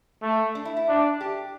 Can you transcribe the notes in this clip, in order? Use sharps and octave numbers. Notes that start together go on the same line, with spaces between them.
A3
D4
E4
E4
D4
G4